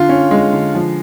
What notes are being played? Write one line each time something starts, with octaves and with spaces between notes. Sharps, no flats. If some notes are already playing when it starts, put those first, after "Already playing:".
Already playing: D3 F4
C#4
G#3
D3
F3